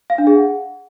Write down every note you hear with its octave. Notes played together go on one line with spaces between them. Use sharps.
F5
D4
G#4
F#5